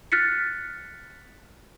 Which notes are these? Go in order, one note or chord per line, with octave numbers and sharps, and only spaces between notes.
F6 F#6 A6 B6 C#7